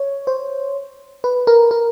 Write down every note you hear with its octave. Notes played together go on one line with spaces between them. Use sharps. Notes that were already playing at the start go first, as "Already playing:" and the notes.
Already playing: C#5
C5
B4
A#4
A#4